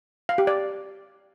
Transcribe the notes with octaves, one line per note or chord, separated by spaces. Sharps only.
F5
G4
D5